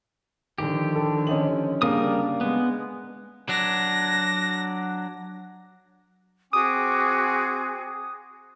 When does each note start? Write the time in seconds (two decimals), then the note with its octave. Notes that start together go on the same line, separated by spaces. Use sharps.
0.58 D3 D#3 F3 G4
0.95 A4
1.27 C#4 D#5 F#7
1.82 C#3 G3 A#3 D4 A#4 D#6
2.41 G#3 B3
3.49 F#3 D4 A#6
6.53 C4 F#4 G#4 G#5 D6 D#6